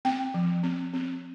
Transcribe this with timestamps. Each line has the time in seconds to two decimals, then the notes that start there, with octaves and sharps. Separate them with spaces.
0.05 C4 G5
0.34 F3
0.63 C4
0.93 C4